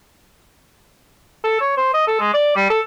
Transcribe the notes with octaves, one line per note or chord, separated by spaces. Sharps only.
A4
C#5
C5
D#5
A4
G#3
D5
G3
A4